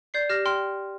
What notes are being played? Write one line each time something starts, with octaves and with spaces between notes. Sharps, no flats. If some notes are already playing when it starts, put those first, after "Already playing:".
D5 G6 C7
G4 F6 A#6
G5 C6 F6